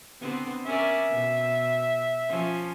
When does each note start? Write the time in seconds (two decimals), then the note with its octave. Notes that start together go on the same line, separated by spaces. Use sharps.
0.21 D3 B3 C4
0.66 C#4 A#4 D5 E5
1.09 B2
2.29 F3 C#4